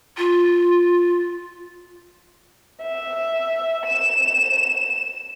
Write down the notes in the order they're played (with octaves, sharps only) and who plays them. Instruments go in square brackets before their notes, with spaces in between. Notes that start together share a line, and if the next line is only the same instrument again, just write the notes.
[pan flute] F4
[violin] E5
E7